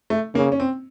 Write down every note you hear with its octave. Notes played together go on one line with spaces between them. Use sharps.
A3
C#3 A#3
C#4
C4